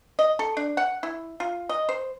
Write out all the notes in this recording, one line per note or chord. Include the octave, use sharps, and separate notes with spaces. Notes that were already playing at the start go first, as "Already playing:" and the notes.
D#5
A4
D4
F#5
E4
F4
D#5
C5